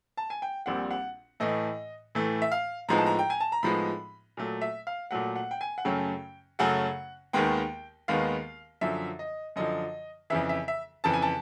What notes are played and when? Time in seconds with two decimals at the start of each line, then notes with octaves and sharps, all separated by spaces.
0.17 A5
0.30 G#5
0.42 G5
0.66 A#1 A#2 G3 C4 F#5
0.91 F#5
1.40 A2 E3 A3 D#5
2.15 A2 E3 A3
2.42 E5
2.52 F5
2.89 A2 F3 G#3 B3 D#4 A#5
2.98 A5
3.06 A#5
3.19 G5
3.30 G#5
3.40 A5
3.52 A#5
3.63 A2 F3 G#3 B3 D#4 B5
4.37 A#2 F#3 A3
4.61 E5
4.87 F5
5.11 A#2 F#3 A3 F#5
5.36 F#5
5.51 G5
5.61 G#5
5.78 F#5
5.85 F#2 C#3 F#3 A3 C#4 G5
6.59 F#2 C#3 F#3 A3 C#4 F#5
7.33 D#2 D#3 G#3 B3 G5
8.08 D#2 D#3 G#3 B3 F5
8.81 F#2 D3 F3 E5
9.19 D#5
9.56 F#2 D3 F3 D#5
10.30 F2 C#3 E3 E5
10.49 E5
10.68 E5
11.04 F2 C#3 E3 A5
11.13 G#5
11.22 A5